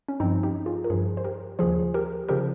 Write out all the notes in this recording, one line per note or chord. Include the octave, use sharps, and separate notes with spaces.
C#4
G2 F3 C4 D#4
D#4 G4
F4 G#4
A#4
G2 F3 G#4 C5
C5
G4 A#4
D#2 C#3 F3 G#4 C5
G4 A#4
C#3 F3 G4 A#4